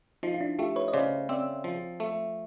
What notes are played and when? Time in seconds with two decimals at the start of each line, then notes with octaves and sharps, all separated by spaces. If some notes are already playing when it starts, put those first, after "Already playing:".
0.23 F3 D#4 F4
0.34 F4
0.41 D4 E4
0.59 A3 F4 G4
0.76 B4 C#5
0.88 D#5
0.93 C#3 C5 D5
1.29 C4 D5 E5
1.64 F3
2.00 A3